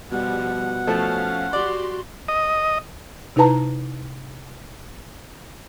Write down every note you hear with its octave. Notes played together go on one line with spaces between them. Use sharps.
B2 F3 G3 F#5
F3 A3 C#4 F5
F#4 G4 D5 C6
D#5
C3 D#4 E4 B4 A5 A#5